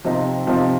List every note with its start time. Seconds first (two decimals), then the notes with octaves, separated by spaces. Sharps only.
0.04 C3 F3 C4 D#4
0.46 C3 F3 C4 D#4